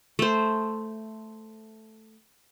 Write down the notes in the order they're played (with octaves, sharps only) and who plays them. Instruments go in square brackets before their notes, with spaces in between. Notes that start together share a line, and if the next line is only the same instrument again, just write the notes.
[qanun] A3 C5